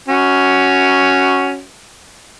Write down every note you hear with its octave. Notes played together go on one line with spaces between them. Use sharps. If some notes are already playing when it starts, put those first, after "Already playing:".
C#4 F#4